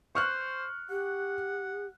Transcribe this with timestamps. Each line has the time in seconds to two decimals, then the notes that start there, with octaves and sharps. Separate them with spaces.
0.15 C5 C#6 F6 F#6
0.90 G4 F#5